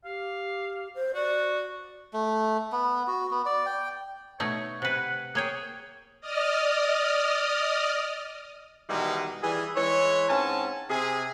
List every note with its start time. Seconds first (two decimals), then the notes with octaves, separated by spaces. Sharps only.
0.05 G4 F5
0.95 C5
1.14 F#4 D5
2.13 A3
2.72 B3
3.07 F#4
3.31 B3
3.46 D5
3.66 G5
4.40 B2 A3 D#4 C#5
4.82 C3 B4 F#5
5.35 A#3 G#4 C#5 G5
6.21 D5 D#5 D#6 F6
8.88 B2 D#3 E3 G3 G#3
9.43 E3 G3 G#4
9.76 E3 G#3 C#5
10.29 G#2 C4 C#4 G#5 A5
10.90 C3 G#4